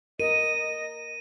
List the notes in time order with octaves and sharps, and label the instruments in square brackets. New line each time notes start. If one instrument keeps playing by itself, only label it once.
[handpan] A#4 [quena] D#5 [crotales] D#7